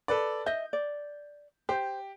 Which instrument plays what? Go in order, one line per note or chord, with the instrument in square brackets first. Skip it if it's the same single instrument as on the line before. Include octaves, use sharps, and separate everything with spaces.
[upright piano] A4 B4 D5
[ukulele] D#5 E5 [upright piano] G6
[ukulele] D5
[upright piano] G4 [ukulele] C5